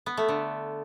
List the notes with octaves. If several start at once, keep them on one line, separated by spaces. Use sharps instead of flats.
B3
A3
D3